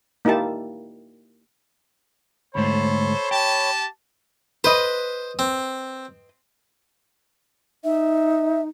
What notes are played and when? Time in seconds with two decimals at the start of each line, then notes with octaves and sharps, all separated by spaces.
0.25 A#3 D#4 E4 G4 A5
2.55 D2 G#2 A3 A4 C5 C#5 B5
3.31 G4 G5 A5
4.64 B4 C5 D#5
5.39 C4
7.84 D#4 E5